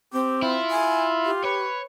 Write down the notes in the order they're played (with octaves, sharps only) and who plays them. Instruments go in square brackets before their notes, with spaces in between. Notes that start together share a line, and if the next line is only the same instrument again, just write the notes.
[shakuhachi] C4 [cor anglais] G4
[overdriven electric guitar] E4 [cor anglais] F4
[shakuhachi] G#5
G4
[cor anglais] B4 [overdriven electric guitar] C#5